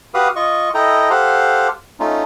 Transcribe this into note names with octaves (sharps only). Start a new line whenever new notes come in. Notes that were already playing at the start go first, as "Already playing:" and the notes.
F#4 G4 B4 F5 D#6
F4 D#5 C#6
E4 A4 D#5 G5 A#5
G4 A4 C5 F5 F#5
A3 C#4 D#4 F4